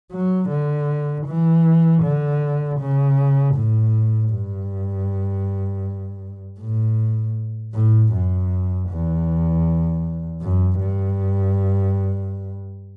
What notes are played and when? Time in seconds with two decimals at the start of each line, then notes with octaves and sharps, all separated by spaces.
0.12 F#3
0.49 D3
1.27 E3
2.03 D3
2.80 C#3
3.55 A2
4.32 G2
6.60 A2
7.74 A2
8.13 F#2
8.90 E2
10.41 F#2
10.80 G2